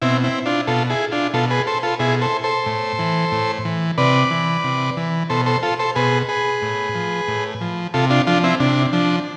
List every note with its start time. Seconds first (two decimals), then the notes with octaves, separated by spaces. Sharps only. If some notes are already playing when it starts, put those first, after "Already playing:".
0.02 B2 C4 E4
0.24 C4 E4
0.46 D4 F4
0.67 B2 F4 A4
0.90 E4 G#4
1.12 D4 F4
1.34 B2 F4 A4
1.50 G#4 B4
1.67 A4 C5
1.83 F4 A4
1.99 B2 E4 G#4
2.21 A4 C5
2.44 A4 C5
2.66 A2
2.99 E3
3.32 A2
3.65 E3
3.98 C3 B4 D5
4.31 E3
4.64 C3
4.97 E3
5.30 B2 A4 C5
5.46 A4 C5
5.63 F4 A4
5.79 A4 C5
5.95 B2 G#4 B4
6.29 G#4 B4
6.62 A2
6.95 F3
7.28 A2
7.61 F3
7.94 C3 F4 A4
8.10 D4 F4
8.27 F3 D4 F4
8.43 C4 E4
8.60 C3 D4
8.93 F3 D4